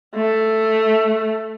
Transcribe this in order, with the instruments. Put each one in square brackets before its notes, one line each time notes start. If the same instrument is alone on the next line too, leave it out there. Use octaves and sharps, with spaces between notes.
[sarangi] A3